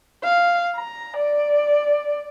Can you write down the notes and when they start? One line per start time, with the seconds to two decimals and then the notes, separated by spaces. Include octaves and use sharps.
0.24 F5
0.76 A#5
1.17 D5